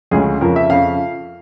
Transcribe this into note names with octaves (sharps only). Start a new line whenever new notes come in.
D2 C#3 F3 G#3 G#4
F2 C#3 F3 A#4
E5
F2 C#3 F3 F5